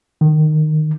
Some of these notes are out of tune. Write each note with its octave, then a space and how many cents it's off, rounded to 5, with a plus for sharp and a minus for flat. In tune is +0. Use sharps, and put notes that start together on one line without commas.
D#3 -15